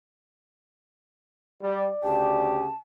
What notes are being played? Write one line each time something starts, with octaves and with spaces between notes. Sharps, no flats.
G3 D5
D2 C#3 G4 A5